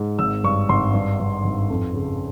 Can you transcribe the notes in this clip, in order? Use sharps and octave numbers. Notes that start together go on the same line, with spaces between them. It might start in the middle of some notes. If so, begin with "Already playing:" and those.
Already playing: G#2
G#1 E6
G2 C#6
G#1 C6
G2
G2
G#1
F2
C#3